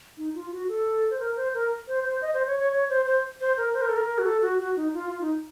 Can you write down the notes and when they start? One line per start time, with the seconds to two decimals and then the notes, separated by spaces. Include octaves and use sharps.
0.18 D#4
0.35 F4
0.52 F#4
0.69 A4
1.11 C5
1.20 A#4
1.36 C5
1.54 A#4
1.88 C5
2.05 C5
2.22 D#5
2.34 C5
2.47 C#5
2.60 C#5
2.73 C#5
2.90 C5
3.06 C5
3.41 C5
3.57 A#4
3.74 C5
3.82 A#4
3.89 A4
3.97 A#4
4.18 F#4
4.25 A4
4.42 F#4
4.59 F#4
4.76 D#4
4.94 F4
5.10 F4
5.21 D#4